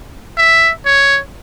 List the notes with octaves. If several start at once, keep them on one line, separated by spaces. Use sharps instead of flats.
E5
C#5